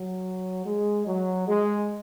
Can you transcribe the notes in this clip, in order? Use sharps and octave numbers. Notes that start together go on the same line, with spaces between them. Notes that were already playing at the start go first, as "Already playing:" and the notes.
Already playing: F#3
G#3
F#3
G#3